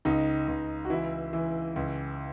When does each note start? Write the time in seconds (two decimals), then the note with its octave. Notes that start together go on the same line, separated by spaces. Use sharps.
0.05 C#2 D#4
0.48 C#2
0.85 F#4
0.90 E3 E4
1.33 E3
1.76 C#2